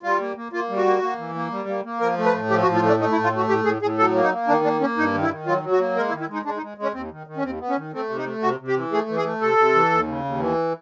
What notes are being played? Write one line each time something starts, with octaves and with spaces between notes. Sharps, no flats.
G3 F4
A#3
A#3
A#3 F4
G3
F#4
A#3
A#3
E3
A#3
G3
A#3
A#3
F3 A#4
A3
B4
A2
F3 G4
F#4
A2
F4
A3 D4
A3 D#4
E4
A2
F4
A3 F#4
A2 G4
A2 G#4
A2 G#4
F#3 A4
A#3
D#4
A#3
D#3 D4
A#3 D4
A#3 C#4
G2 D#4
D#3
E4
D#3
F#3 F4
F#3
F#4
A#3
G#3 A#4
E4
D#3
E4
G#3 D#4
G#3 D4
D#4
G#3
G#3 C#4
D#2 C4
D#3
D#3
C#4
D#2 C4
B3
C#4
D#3
A3 C4
C3
D#4
A3
C3 F#4
C3
G4
E3
A3 G#4
E3
G#4
A3
C3 A4
C3
E3
D#2
C#3
D#2
E3